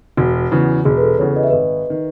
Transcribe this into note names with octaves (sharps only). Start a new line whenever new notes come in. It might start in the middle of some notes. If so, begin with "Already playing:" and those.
E1 F#4
E2 C#3 E3 B3
E1 G#4
B4
A4
E2 C#3 E3 B3 C#5
D#5
E5
G#1 B4 D#5
D#3